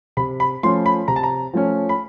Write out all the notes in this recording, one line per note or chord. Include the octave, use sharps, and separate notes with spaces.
C3 B5
B5
F3 A3 C#4 C6
B5
C3 A#5
A5
A#5
F3 A3 C#4
B5